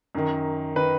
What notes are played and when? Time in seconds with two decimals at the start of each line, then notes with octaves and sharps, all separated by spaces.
0.15 F#2 D#3
0.76 D#3 B4